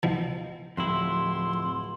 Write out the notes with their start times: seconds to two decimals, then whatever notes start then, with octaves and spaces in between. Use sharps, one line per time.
0.03 B2 E3 F3
0.77 D1 F2 E4 C6